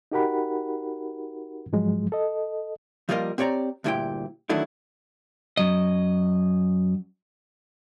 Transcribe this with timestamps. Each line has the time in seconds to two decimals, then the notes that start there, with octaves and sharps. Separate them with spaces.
0.12 D#4 F#4 G4 A#4 F#5 B5
1.73 G#2 F3 F#3 G#3
2.12 A4 D#5
3.09 F3 G3 A#3 F4 A#4 D#5
3.38 C4 G4 C#5 D5 A#5
3.84 D2 G2 A#2 E4 G4 G5
4.49 D#3 E3 F#3 A3 D4 E4
5.57 F#2 F#3 D#5